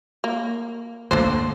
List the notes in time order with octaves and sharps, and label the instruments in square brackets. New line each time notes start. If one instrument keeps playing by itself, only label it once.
[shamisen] A#3
[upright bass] D2 D3 [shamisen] A#3 A4 C5